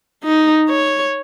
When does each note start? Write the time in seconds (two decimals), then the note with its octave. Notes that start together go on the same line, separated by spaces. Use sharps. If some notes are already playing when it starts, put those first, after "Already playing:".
0.24 D#4
0.69 C#5